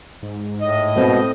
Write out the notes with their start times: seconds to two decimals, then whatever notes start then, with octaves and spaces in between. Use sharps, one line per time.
0.23 G#2
0.61 A2 D#5
0.96 B2 A3 C4